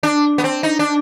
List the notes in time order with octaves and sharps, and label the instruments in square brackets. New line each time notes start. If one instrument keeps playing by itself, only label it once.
[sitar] D4
B3
C4
D#4
D4